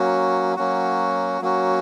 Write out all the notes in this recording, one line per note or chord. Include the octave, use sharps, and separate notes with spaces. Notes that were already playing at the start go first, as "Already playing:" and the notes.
Already playing: F#3 A#3 C#4 F#4
F#3 A#3 C#4 F#4
F#3 A#3 C#4 F#4